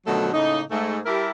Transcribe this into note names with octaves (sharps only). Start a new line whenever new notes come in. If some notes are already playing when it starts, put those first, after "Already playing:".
B2 D3 D#3 F3 F#3 A3
A2 C#3 A#3 D#4
G#2 A3
G3 E4 G4 A4 A#4